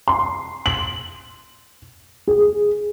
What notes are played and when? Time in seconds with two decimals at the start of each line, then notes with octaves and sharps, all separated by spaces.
0.08 C6
0.66 F#7
2.28 G#4